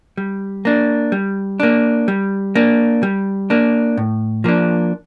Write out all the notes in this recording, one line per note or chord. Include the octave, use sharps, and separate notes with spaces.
G3
A#3 D4
G3
A#3 D4
G3
A#3 D4
G3
A#3 D4
A2
F3 A#3 D4